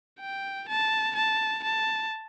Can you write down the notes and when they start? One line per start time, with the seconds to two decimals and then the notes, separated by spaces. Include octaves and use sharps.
0.20 G5
0.68 A5
1.16 A5
1.63 A5